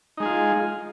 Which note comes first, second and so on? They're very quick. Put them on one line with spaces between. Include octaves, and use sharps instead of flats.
D#4 G#3 G#4 F4